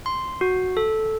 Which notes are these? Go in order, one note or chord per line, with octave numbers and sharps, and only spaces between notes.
C6
F#4
A4